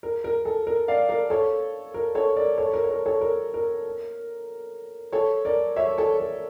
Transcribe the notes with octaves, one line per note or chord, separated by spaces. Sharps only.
A#4
A#4
A4
A#4
D5 F5
A#4 D5
A4 C#5
A#4
A4 C#5
A#4 D5
A4 C#5
A#4
C#5
A#4
A4 C#5
A#4
A#4
A4 C#5
A#4 D5
C#5 E5
A4 C#5
A4